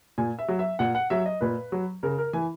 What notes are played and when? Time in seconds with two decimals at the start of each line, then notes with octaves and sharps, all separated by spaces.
0.18 A#2 G#5
0.39 E5
0.48 F#3
0.59 E5
0.79 A#2 F#5
0.95 F#5
1.10 F#3 E5
1.26 D#5
1.41 A#2 B4
1.72 F#3
2.03 C#3 A#4
2.18 A#4
2.33 E3 G#5